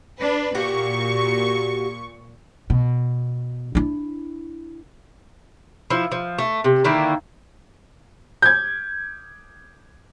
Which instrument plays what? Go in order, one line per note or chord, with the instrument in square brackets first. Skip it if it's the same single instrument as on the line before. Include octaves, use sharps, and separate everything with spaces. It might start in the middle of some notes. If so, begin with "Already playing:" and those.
[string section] D4 B4
[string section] A#2 C#6 [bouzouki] A#3 F#4 G4
[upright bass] B2
D4 E4
[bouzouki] F3 E4
F3
A3
C3
D3 D#3 A#3 E4
[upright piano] G6 G#6